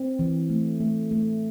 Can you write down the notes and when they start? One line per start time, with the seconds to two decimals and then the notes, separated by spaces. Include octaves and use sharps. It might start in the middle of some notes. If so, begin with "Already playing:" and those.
Already playing: C4
0.19 E3
0.50 A3
0.80 A3
1.11 A3